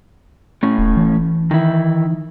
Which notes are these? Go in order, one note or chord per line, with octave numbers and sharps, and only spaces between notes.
A2 C#4
D1
E3
D#3 E4